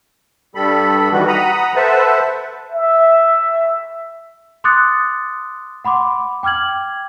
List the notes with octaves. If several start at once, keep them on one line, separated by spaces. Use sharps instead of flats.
G2 G3 A4 B5
D#3 E3 G3 B3 F#4
F#5 A#5 B5 D#6
A4 B4 C5 E5 F#5 A5
E5
C6 D6 D#6 F#6 A6 C#7
F#5 B5 C6 D6
G5 D6 F6 G#6 F#7